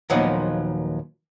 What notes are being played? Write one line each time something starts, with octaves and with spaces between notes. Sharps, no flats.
D#2 A#2 F3 F#3 B3 D#4